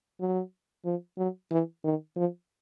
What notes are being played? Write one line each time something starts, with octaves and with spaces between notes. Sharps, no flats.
F#3
F3
F#3
E3
D#3
F3